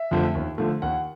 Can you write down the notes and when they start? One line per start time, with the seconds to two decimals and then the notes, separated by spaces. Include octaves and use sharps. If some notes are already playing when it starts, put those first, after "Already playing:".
Already playing: E5
0.11 F2 D3 F3 A3
0.35 D#2
0.58 D3 F3 A3
0.82 D#2 F#5